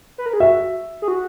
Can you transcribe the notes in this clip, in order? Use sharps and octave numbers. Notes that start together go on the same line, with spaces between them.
B4
A#4
G#4
F#4 E5
G#4
F#4